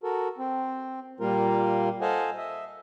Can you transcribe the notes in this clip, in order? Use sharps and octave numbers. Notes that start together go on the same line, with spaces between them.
F#4 A4 A#4
C4
A#2 G3 A#3 F4 A#4
A4 C5 D#5 F5 F#5 G#5
D#5 E5